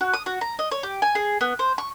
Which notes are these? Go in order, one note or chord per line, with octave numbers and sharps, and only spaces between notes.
F#4
D#6
F#4
A#5
D#5
C#5
G4
G#5
G#4
B3
C5
C#6